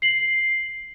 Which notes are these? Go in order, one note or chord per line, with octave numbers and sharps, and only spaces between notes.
C7 F#7